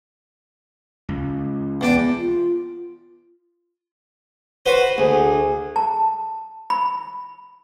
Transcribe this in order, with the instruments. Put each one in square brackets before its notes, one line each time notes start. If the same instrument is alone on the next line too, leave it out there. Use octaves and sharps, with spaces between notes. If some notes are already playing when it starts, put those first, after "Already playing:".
[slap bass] C#2
[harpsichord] E2 D4 G5
[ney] F4
[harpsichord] F#4 B4 C5
[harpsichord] D2 [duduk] G#4
[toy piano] A5
B5